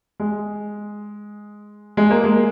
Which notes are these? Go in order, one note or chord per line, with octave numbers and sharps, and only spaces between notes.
G#3
G#3
A#3
G#3